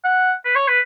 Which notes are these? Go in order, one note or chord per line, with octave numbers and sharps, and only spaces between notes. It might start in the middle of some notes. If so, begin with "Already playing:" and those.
F#5
B4
C#5
B4